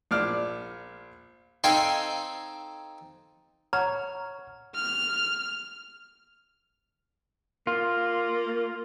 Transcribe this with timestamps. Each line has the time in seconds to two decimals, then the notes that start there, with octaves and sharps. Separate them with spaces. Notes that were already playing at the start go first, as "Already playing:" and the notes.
0.11 A#1 D5 F6
1.64 C4 D#4 A4 F5 G5 G#5
3.73 C#5 F#5 A#5 F6
4.75 F6
7.67 A#3 F4